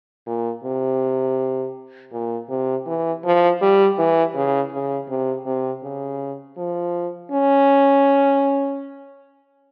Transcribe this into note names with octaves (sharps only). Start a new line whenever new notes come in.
A#2
C3
A#2
C3
E3
F3
G3
E3
C#3
C#3
C3
C3
C#3
F3
C#4